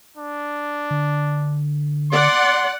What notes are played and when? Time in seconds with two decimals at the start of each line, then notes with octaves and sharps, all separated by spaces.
0.17 D4
0.91 D3
2.12 D5 F#5 C6